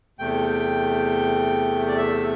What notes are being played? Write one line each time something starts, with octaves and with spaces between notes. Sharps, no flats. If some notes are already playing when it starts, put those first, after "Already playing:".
E2 C3 A3 G5
G5
D5
E5